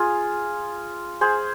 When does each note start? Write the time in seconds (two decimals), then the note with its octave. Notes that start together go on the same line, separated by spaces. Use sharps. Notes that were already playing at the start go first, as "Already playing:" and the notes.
Already playing: F4 G#4
1.21 G#4 C5